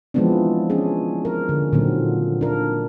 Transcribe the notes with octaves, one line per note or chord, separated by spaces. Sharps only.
E3 F3 G#3 B3 C4 D4
C#4 D4 G#4
A#4
D3
A#2 D3 D#3 F#3 C4
D4 A#4